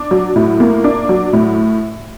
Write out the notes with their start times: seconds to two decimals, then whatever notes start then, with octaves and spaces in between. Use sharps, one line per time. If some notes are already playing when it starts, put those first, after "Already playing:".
Already playing: D4
0.11 F#3
0.36 A2
0.60 A#3
0.84 D4
1.09 F#3
1.33 A2